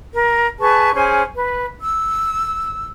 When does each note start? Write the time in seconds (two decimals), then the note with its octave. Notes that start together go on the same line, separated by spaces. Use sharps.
0.13 A#4
0.59 G#4 B4 A5 C#6
0.95 C#4 G#4 C5 G#5
1.34 B4
1.81 E6